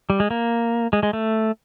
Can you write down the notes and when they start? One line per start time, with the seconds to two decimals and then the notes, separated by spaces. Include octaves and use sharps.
0.10 G3
0.20 G#3
0.31 A#3
0.93 G#3
1.03 G#3
1.13 A3